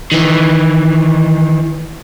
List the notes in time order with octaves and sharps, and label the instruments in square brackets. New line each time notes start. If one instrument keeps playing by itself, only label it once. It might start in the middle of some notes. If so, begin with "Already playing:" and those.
[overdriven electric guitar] D#3 E3